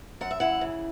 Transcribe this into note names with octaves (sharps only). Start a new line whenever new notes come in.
F#2 F#5
E5
E4 F#5
C#3